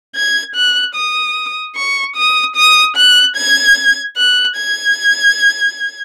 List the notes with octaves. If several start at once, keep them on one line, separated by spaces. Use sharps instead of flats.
G#6
F#6
D#6
C#6
D#6
D#6
F#6
G#6
F#6
G#6